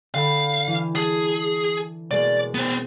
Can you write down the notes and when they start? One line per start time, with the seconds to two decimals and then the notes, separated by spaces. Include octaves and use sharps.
0.14 D3 F5 G5 B5
0.67 E3
0.95 G#4 A5 G#6
2.11 B2 G#3 A#3 D5
2.54 B3 C5